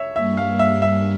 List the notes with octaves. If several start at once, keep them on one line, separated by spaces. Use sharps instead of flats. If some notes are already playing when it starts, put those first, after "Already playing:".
Already playing: C#5 E5
G2 G3 A#3 E5
F5
E5
E5